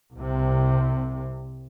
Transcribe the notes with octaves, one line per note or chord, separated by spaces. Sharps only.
C2 C3